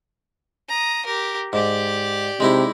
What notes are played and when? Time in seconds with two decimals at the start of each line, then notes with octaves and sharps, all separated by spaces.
0.69 A#5 D#6
1.06 G4 A#4
1.53 G#2 G4 D5
2.40 C3 G#3 D#4 E4